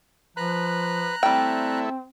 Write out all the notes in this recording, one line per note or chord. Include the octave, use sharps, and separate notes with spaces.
F3 B4 A#5 F#6
G3 A3 C4 E4 G5